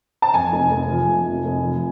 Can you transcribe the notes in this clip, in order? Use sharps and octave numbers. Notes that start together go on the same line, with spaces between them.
A5
F2 G#5
F1
F1
F3
A3
F1
F1
F3